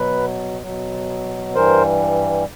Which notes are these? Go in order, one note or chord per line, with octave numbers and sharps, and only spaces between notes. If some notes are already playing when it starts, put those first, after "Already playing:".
Already playing: B2 F#3 B4
B2 F#3
G2 E3 G3 A#4 C5